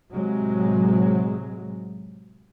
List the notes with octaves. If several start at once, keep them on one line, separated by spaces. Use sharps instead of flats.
A2 C3 F#3 G#3